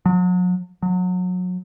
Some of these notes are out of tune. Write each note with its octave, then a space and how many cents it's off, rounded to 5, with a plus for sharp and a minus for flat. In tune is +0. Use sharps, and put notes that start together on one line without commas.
F#3 -40
F#3 -30